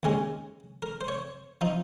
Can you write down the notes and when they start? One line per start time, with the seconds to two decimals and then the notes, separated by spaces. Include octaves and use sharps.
0.03 D#2 D#3 G#3 C#4 G#4
0.82 A#4
1.01 C5
1.08 C#5
1.61 F3 D#4